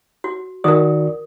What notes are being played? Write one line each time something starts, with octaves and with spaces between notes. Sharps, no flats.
F#4
D#3 F#4 A#4 D5 D#6